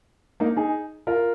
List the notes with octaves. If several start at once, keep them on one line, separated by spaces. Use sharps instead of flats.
A#3 D#4
D#4 G#4
F4 A#4